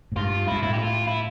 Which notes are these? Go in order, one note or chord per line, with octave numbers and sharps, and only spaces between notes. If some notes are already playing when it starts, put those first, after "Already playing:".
A2
G2 F4
G2 E4
A2 E4
G4
F4
E4